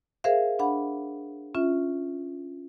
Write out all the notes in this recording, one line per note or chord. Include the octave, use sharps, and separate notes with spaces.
G#4 A#4 C5 E5 F5
D4 F#5 B5
C#4 F4 E5